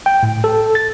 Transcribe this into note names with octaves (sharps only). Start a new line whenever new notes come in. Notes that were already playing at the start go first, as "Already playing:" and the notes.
G5
A2
A4
A6